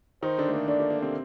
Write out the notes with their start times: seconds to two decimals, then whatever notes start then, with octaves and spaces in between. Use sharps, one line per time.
0.23 D#3 D#4 C5
0.38 D3 D4
0.48 A3
0.54 A#3
0.68 D3 D4 D5
0.80 A#3
0.90 A#3
1.02 C3 C4